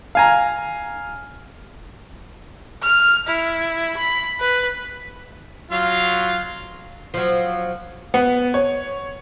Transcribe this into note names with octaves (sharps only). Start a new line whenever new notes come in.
F5 G#5 A#5
F6
E4
B5
B4
F#3 F4 F5
F3 F#3
B3
C#5